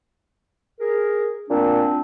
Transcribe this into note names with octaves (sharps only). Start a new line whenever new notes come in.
G#4 A#4
A#2 A3 C4 D4